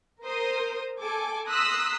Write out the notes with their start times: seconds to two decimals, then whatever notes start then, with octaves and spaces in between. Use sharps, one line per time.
0.22 A#4 C5 D#6
0.99 A4 G#5 D6
1.48 A#5 C6 D#6 E6 F#6 B6